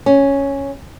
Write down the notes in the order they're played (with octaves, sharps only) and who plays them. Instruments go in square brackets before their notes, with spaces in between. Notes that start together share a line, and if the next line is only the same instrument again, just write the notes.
[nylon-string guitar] C#4